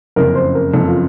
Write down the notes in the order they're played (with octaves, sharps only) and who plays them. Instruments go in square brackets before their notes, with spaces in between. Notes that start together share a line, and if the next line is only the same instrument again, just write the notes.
[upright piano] F#1 F2 C#3 [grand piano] A#4
[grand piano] C5
A#4
[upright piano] F#1 F2 C#3 [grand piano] A4
[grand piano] F4